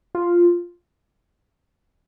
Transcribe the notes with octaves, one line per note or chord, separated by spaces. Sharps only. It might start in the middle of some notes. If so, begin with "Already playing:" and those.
F4